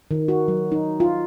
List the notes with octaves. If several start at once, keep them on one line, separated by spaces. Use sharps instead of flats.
D#3
F#4
F#3
D#4
F4